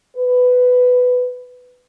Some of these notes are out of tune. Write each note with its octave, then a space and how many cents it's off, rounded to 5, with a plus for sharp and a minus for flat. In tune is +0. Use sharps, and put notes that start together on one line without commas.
B4 +10